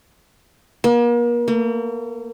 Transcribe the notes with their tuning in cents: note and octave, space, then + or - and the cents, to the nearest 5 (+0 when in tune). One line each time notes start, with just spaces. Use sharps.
A#3 +40
A#3 -40